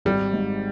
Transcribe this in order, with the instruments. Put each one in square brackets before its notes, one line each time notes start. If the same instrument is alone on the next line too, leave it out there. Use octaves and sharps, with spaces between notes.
[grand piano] G#1 [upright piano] G3
[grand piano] G#2